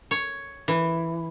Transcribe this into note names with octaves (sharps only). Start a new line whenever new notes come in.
C#5
E3